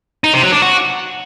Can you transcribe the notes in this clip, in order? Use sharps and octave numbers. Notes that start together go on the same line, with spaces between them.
D#4
C3
F#3
D4
F#4